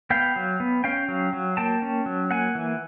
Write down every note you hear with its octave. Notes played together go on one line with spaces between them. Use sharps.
B3 F5 G5
F#3
B3
C#4 F5 G5
F#3
F#3
A#3 G5 A5
C#4
F#3
A#3 F#5 G#5
E3